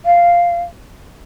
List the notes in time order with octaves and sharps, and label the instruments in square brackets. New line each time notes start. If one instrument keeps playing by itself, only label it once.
[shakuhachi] F5